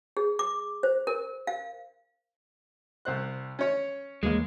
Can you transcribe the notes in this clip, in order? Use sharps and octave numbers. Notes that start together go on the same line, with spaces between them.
G#4
D6
C5
A#4
F5
C2 C5 F#6
C#4 C#5
D#2 E3 G#3 A#3